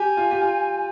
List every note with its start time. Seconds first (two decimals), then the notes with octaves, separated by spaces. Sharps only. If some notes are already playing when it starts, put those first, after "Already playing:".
Already playing: G4 G#5
0.17 F4
0.31 G4
0.41 F4